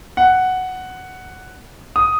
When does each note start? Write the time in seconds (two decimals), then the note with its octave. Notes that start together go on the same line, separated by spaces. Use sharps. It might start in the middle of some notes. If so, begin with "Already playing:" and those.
0.17 F#5
1.96 D#6